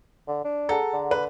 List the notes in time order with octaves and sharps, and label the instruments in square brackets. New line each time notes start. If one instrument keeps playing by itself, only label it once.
[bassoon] D3
D4
[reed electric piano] G#4 F#5 A#5 [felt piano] A4
[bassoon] D3
[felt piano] B4